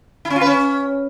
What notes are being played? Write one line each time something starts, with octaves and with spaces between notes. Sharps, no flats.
E4
C#4
F4
B4
C#4